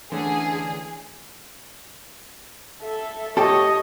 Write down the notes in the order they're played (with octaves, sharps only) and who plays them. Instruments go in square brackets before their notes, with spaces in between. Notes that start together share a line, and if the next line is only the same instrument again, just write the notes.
[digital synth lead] D3 [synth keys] E3 A3 C#4 [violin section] G#4
[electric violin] A4 E5
[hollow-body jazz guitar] A2 G4 A4 [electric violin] C#5 D#5